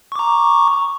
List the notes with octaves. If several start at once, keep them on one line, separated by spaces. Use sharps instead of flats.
A#5 C#6 D6